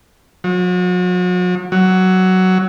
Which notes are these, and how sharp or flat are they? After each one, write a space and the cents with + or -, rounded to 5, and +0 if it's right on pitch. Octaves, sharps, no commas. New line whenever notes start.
F#3 -40
F#3 +10